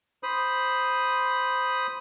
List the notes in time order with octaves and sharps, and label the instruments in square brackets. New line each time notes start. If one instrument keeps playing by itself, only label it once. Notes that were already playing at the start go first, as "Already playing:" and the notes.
[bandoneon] C5 B5 D#6